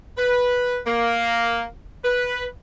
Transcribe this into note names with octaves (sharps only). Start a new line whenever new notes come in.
B4
A#3
B4